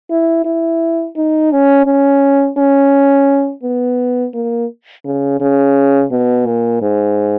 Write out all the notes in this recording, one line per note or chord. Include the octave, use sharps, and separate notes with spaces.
E4
E4
D#4
C#4
C#4
C#4
B3
A#3
C#3
C#3
B2
A#2
G#2